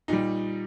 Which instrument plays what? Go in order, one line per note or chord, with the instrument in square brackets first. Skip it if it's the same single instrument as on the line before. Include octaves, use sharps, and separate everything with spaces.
[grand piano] A#2 G3 D#4